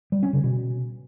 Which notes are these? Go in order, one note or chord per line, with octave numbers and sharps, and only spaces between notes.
G3
C#4
C#3
B2